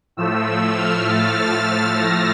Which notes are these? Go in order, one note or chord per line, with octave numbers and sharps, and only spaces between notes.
A2 F3 A3 E6
F6
A6
A#6